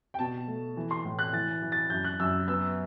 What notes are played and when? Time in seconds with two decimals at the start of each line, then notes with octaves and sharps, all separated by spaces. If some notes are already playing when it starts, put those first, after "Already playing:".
0.14 G5
0.19 B2 A5
0.48 A3
0.77 E3
0.91 C6
1.05 A2
1.19 F#6
1.33 E3 A6
1.62 E3
1.72 A6
1.90 F#2 G6
2.04 F#6
2.20 F#2 E6
2.47 B3 E6